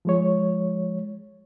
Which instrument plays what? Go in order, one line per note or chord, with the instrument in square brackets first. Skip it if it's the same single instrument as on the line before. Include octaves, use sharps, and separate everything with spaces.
[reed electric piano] F3 G#3 C#5